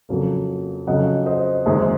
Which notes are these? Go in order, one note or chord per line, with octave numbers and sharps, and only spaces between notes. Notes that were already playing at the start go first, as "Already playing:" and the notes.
F2 C#3 F#3 A#3
F2 C#3 F#3 D#5 F#5
C5 D#5
F#1 F#2 D#3 G#3 G#4 C5